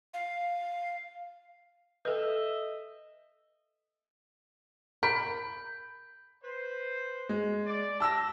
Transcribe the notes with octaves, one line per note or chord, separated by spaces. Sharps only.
F5
A4 B4 D#5 E5
A#4 B5 G6 B6 D7
B4 C5
G#3
D5
G4 E5 A5 E6 A#6